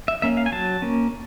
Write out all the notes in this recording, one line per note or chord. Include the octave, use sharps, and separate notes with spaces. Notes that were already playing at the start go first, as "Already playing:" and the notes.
E5
A#3 C#4 E5
F5
G#5
F#3 A5
A#3 C#4